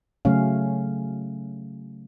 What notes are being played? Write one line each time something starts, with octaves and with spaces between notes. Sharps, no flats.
C#3 F#3 A3 C#4 F5